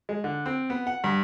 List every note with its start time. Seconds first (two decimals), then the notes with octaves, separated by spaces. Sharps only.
0.09 G#3
0.24 D3
0.46 C4
0.70 B3
0.87 F#5
1.04 G2